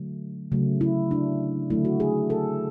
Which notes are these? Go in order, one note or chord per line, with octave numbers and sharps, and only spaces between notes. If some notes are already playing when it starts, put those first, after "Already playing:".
Already playing: D3 F#3 A3
C#3 F#3 A3
E4
D4
D3 F#3 A3 E4
F#4
G#4
A4